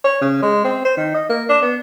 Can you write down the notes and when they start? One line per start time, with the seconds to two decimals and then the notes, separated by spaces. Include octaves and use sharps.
0.04 C#5
0.21 C#3
0.42 G#3
0.64 C4
0.84 C5
0.97 D#3
1.14 D#5
1.29 A#3
1.49 D4
1.62 B3